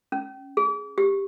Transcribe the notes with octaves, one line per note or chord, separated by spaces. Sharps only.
C#4
G#4
G4